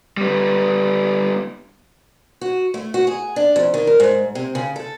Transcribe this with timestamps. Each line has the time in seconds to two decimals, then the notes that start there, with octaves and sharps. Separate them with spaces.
0.17 G3 B3
2.41 F#4
2.74 A3
2.94 F#4
3.07 G#4
3.36 D4
3.56 F2
3.74 D#3
3.87 A#4
4.00 G#2
4.35 C3
4.55 C#3
4.76 A4